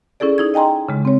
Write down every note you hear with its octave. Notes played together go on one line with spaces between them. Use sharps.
C#4 E4 G#4 A4 D5
D#4 E4 G#6
D#5 G5 G#5 A#5 C6
C#3 G#3
C4 C#5